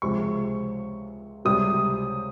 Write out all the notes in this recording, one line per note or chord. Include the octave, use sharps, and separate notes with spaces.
C#2 C3 F3 G#3 C#6
C#2 C3 G3 D#6